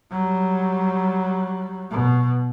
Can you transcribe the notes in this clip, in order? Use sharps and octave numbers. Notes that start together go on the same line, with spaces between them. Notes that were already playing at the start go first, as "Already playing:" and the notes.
F#3 G3
B2